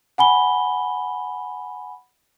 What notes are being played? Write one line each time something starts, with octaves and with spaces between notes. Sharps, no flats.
F#5 G#5 B5 G7